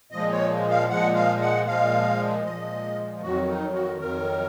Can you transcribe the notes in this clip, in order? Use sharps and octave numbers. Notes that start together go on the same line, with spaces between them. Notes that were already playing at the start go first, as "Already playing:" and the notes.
A#2 F3 G#3 D#5
C#5
F5
A#2 F3 G#3 F#5
F5
F#5
A#2 F3 G#3 F5
A#2 F3 G#3 D#5
F2 D#3 F#3 F#4
D#4
F#4
F2 D#3 F#3 A#4